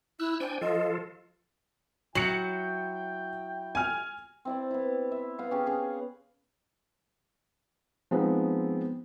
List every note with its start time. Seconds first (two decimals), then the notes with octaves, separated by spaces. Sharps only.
0.20 E4 E6 F#6
0.40 D4 C5 G5 G#5
0.61 F3 F4 A4 D#5
2.15 F#3 E4 G5 C#7 F#7
3.75 G#5 F6
4.45 C4 E4 D5
4.71 B3 E4
5.11 E5
5.39 B3 F5
5.51 C#4 G4 G#4
5.66 C#4 G#4
8.11 F3 G#3 B3 C4 D#4